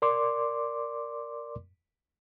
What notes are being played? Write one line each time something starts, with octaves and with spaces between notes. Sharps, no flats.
A#4 D5 C6 D6